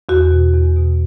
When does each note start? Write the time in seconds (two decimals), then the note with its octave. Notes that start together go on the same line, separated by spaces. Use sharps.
0.09 E2 F#4
0.31 B2
0.54 E2
0.76 B2